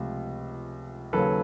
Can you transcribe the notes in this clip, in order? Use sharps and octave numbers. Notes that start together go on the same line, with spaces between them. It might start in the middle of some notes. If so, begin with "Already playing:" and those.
Already playing: C#2 C3 F3 A3
D#2 C#3 F#3 A#3 A4 B4